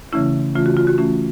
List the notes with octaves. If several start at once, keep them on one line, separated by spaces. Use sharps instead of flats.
C#3 E3 A3 C#4 E4
C#3 E3 A3 C#4 F4
F#4
F4
F#4
E3 A3 C#4